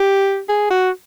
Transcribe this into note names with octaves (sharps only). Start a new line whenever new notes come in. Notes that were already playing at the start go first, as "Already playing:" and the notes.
Already playing: G4
G#4
F#4